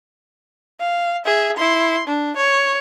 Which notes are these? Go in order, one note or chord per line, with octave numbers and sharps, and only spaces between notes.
F5
G#4 E5
E4 C6
D4
C#5